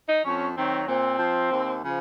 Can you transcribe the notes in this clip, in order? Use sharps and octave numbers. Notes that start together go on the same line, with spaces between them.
D#4
F2 C#4
D#3 F#3 C4
A#2 C4
F3
D#2
C#3 F3